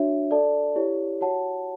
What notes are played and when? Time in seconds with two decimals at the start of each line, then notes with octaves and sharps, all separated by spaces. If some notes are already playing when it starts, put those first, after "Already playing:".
Already playing: D4 F#4 C#5 E5
0.31 A4 D5 A5
0.76 E4 G4 C#5
1.21 F#4 C#5 F#5 A5